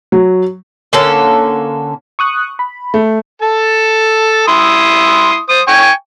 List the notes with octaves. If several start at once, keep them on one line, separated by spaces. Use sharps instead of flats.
F#3
D3 A#3 C#4 A4
C#6 D#6 F#6
B5
A3
A4 A5
E4 C6 D#6
C5 D#6
G5 G#5 C#6